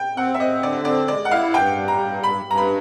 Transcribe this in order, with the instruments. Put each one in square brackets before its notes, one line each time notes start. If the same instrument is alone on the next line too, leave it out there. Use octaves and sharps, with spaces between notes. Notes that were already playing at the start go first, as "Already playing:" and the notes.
Already playing: [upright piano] G5
[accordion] C4 [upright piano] F#5
[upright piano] E5
[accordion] C4 [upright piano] D#5
[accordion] D3 [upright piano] D5
[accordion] C4 [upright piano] D5
[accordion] G#3 [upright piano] D5
[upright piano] F#5
[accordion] E4 [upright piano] F5
[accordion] G2 [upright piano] G5
[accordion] G3
[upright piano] A#5
[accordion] G2
[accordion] G2 [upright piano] B5
[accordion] G2
[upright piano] A#5
B5